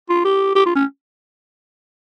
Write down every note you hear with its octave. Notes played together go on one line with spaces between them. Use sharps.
F4
G4
G4
F4
C#4